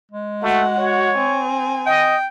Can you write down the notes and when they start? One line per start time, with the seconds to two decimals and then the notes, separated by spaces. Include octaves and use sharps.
0.11 G#3
0.42 A3 F#4 F#5
0.78 F#4 C#5
1.17 C4 G#5
1.86 D#5 G5